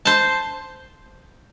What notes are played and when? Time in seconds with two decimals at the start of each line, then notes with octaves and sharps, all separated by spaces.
0.05 C5 A5